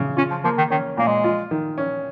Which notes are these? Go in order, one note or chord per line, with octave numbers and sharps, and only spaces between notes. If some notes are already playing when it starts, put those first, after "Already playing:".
Already playing: C#3
C#4 F4
F3
F3 A#3
D#3
D#3 C#4
A#2 A#3
G#3
F4
D#3
C#4